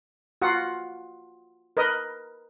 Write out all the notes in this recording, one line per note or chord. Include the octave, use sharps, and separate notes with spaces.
F4 F#4 F#5
A#4 B4 D#5